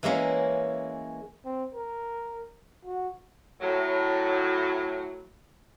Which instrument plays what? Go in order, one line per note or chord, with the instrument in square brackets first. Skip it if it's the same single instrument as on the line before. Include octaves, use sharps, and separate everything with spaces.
[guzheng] E3 G#3 A#3 C#4
[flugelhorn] C4
A#4
F#4
[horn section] A2 F#3